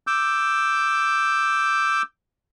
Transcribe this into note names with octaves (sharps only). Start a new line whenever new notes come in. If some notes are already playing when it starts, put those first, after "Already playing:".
D6 E6 G6